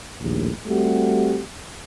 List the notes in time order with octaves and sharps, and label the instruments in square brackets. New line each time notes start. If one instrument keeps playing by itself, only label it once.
[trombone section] A#1 D#2 A2
G3 A3 C4 F#4 G4